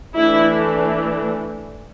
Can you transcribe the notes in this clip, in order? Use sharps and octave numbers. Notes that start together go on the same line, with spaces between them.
E3 A3 D4 E4